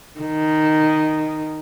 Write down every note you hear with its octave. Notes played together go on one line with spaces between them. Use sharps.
D#3